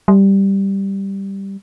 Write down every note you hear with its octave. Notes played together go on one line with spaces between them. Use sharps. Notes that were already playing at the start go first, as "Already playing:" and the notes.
G3